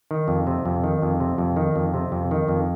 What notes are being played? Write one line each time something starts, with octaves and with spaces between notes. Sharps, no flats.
D#3
F2
C3
F2
D#3
F2
C3
F2
D#3
F2
C3
F2
D#3
F2